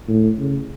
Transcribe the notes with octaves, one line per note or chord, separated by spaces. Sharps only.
A2
C#3